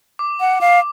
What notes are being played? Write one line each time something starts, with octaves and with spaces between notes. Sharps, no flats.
D6
F#5
F5